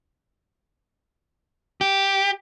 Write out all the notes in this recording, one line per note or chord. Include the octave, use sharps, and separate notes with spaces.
G4